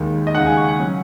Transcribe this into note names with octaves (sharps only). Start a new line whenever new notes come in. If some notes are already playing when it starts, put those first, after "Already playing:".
Already playing: D#2 D#3 G#3
D#5
D#2 C#3 G#3 D#4 F#5
G#5
C#6
F#5
F#3 C#4